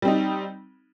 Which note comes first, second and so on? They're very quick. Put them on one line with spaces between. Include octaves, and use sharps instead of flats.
G3 C4 D#4